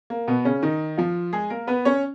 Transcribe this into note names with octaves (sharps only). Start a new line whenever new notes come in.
A#3
B2 B3
C#3 C#4
D#3 D#4
F3 F4
G#3 G#4
A#3 A#4
B3 B4
C#4 C#5